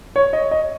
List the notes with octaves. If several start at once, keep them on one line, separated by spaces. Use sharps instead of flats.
C#5
D#5
D#5